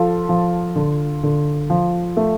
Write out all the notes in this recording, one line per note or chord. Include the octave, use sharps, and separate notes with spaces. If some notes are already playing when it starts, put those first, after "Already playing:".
Already playing: F3 F4 A4
F3
D3
D3
F3
A3